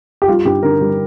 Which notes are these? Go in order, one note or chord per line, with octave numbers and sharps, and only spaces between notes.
G4
G3 F4
G2 G4
D3 A#4
G3